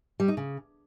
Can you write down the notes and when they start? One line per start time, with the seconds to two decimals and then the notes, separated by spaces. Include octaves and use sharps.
0.20 G3
0.28 D#4
0.37 C#3